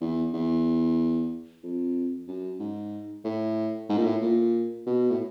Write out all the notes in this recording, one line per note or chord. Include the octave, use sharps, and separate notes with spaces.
E2
E2
F2
F#2
G#2
A2
G#2
A#2
A2
A#2
B2
A2